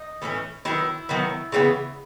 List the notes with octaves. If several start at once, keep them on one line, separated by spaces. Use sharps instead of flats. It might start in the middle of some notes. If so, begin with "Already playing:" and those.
Already playing: D#4
A2 E3 A3 C#4
D#3 F#3 B3 E4
D#3 F#3 B3
C#3 E3 G3 B3